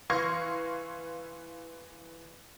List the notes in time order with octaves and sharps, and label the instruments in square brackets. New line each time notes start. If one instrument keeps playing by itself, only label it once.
[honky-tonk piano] E3 F5 C6 C#6 G#6 A#6